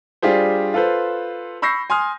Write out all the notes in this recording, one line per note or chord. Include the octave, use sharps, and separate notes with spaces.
G3 D4 F4 G4 G#4 C5
F4 A4 B4 C5
B5 C#6 E6 G6 A#6 C7
G#5 C6 D#6 F6